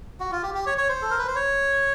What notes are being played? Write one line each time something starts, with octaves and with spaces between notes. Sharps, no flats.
F#4
F4
G4
G4
C#5
C#5
C5
A4
A#4
B4
C5
C#5